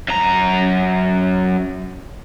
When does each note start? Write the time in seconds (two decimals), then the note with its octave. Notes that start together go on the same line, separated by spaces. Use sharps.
0.08 F#2 A#5